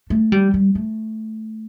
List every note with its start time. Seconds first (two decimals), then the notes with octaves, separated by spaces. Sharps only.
0.10 A3
0.32 G3
0.54 G3
0.75 A3